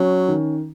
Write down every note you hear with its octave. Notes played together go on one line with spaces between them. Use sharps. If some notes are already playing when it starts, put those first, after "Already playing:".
Already playing: F#3 C#4
D#3